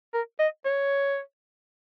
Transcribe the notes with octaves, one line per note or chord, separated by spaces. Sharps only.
A#4
D#5
C#5